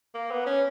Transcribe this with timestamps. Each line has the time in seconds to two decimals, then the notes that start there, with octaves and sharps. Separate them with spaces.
0.15 A#3
0.31 B3
0.47 C#4